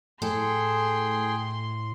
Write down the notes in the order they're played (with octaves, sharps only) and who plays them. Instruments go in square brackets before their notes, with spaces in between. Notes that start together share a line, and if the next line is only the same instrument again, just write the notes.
[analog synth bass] A2 [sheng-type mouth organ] G#4 G5 [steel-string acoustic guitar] A4 [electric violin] C6